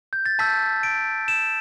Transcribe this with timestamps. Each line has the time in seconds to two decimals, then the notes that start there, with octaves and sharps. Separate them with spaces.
0.13 G6
0.26 A6
0.39 A5 E6 G6 B6
0.83 D7
1.28 E7